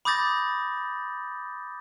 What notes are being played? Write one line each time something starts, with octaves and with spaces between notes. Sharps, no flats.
B5 D6 D#6 G6 A6 A#6